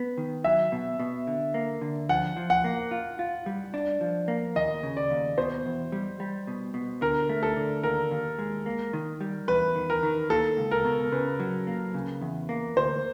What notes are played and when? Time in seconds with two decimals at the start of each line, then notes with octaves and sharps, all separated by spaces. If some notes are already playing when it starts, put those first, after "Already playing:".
Already playing: B3
0.18 D#3
0.44 F#3 E5
0.72 B2
1.00 B2
1.27 D3
1.54 A#3
1.81 D3
2.09 F3 F#5
2.37 F3
2.50 F#5
2.64 A#3
2.91 F4
3.19 F4
3.46 G3
3.74 D4
4.01 F3
4.28 A#3
4.56 D#2 D#5
4.83 C#3
4.97 D5
5.10 D#2
5.38 B2 C5
5.65 E2
5.92 G3
6.20 G3
6.47 B2
6.74 B2
7.01 D3 A#4
7.29 A3
7.43 A4
7.56 D3
7.83 D#2 A#4
8.11 D#2
8.39 G#3
8.66 A#3
8.93 D#3
9.21 G3
9.48 E2 B4
9.76 D#3
9.90 A#4
10.03 D#3
10.30 A#3 A4
10.57 C#2
10.71 A#4
10.85 B2
11.12 C#3 B4
11.40 F#3
11.67 A#3
11.94 C#3
12.22 E2
12.49 A#3
12.77 D2 C5